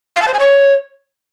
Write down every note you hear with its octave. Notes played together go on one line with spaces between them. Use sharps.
F5
A5
C5
G#5
C#5